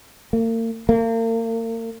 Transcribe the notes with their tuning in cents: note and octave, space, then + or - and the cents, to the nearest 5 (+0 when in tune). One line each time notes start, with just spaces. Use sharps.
A#3 -40
A#3 -40